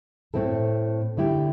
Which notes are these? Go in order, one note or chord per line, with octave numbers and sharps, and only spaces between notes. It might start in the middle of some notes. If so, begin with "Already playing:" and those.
A2 A3 C4 E4 A4
D3 A3 E4 G4